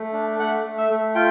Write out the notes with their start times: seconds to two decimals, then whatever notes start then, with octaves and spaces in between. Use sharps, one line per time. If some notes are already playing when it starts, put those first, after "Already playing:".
Already playing: A3
0.13 D4
0.39 A3 F#5
0.64 A3
0.78 E5
0.90 A3
1.15 F4 G5